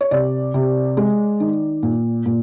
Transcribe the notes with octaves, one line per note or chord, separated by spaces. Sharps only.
C#5
C3 D5
C3
G#3
D#3
A#2
A#2